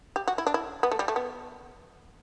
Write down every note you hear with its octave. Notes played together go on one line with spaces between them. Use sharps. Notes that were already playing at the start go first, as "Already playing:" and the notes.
G4
F#4
E4
D4
E4
B3
A3
G3
A3
B3